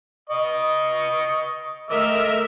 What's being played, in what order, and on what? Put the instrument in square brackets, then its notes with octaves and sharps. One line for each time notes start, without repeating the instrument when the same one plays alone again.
[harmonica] D#5 C#6 D#6
[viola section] A3 A#4 E5 [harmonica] D#5 D6 E6